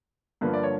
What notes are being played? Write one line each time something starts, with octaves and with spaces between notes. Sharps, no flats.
G2 D3 F3 A#3 B4
D5
C#5